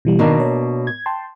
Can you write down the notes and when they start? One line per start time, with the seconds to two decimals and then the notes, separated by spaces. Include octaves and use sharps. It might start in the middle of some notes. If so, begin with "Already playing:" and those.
0.05 B2 E3 G3
0.19 B2 D#3 A#3 D4
0.40 C#5
0.87 G#6
1.06 G5 A5 C6